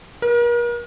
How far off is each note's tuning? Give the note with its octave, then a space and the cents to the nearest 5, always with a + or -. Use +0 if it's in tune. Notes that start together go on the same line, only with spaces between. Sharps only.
A#4 +40